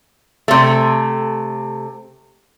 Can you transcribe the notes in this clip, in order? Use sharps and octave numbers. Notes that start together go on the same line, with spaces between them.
C3 A3